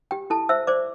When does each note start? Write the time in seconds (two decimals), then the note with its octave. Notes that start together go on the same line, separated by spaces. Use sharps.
0.11 G4 G5
0.30 E4 A4 A5
0.49 C5 E5 E6
0.67 C5 D5 D6